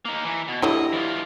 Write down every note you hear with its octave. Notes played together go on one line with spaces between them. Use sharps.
A#3 D#4
E3
B2
D3 F#3 G3 E4 D#5
E3 F4